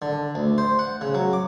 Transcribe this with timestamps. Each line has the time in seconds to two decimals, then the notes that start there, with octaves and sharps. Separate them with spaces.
0.02 D3
0.35 D2
0.58 C5
0.79 F#5
1.01 C#3
1.14 F#3
1.33 D6